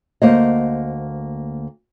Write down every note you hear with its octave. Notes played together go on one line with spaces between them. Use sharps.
D2 A#3 C5 D#5